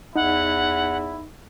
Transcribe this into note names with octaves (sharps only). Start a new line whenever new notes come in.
E2 D#4 E4 F#5